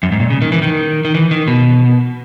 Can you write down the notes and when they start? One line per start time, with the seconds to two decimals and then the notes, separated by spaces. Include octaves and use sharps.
0.03 F#2
0.12 G#2
0.20 A#2
0.30 C#3
0.42 D#3
0.52 E3
0.62 D#3
1.05 D#3
1.15 E3
1.31 D#3
1.48 B2